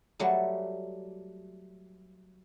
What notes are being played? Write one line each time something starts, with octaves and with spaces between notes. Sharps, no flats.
F#3 G3 A3